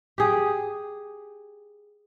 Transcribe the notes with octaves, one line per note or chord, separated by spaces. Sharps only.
G4 G#4